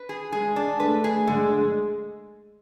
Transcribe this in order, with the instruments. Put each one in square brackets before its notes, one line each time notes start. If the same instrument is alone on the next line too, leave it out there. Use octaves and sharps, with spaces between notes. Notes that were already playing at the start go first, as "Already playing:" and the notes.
Already playing: [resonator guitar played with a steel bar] B4
G#4
[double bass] G#3 [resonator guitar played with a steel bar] G#4
[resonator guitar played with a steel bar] D4
[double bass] A3 [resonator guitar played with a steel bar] B4
[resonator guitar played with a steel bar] G#4
[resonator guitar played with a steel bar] D3 [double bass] G#3